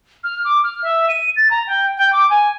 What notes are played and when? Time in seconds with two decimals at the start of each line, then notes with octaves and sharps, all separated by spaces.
0.24 F6
0.45 D6
0.64 F6
0.83 E5
1.09 D#7
1.36 A6
1.50 A#5
1.67 G5
1.97 G5
2.13 D6
2.30 G#5